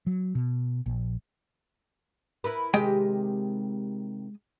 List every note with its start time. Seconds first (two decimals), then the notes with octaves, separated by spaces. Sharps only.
0.07 F#3
0.35 B2
0.86 A#1
2.44 E4 A#4 B4
2.74 C3 D#3 G#3 G4 D#5 G5